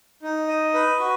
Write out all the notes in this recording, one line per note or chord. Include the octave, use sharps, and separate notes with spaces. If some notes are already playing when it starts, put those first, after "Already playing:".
D#4
D#5
B4
F#4